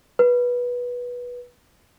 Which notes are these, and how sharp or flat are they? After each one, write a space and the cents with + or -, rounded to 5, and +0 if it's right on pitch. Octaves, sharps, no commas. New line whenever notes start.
B4 -15